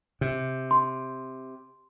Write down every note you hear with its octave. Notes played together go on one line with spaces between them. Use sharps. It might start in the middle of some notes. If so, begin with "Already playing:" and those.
C3
C6